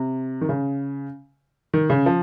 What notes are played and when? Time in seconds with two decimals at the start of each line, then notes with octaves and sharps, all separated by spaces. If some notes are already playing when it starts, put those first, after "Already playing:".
Already playing: C3
0.41 D#3
0.49 C#3
1.74 D#3
1.90 C#3
2.06 F3